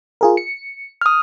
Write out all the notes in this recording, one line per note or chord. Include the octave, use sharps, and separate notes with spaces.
F4 G#4 A#4
C#7
D#6 F6